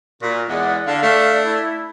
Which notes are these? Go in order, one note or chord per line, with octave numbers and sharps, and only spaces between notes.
A#2 F4 F#4 A#4
E2 G#3 D5 F#5
D3 F5
A3 D4
E4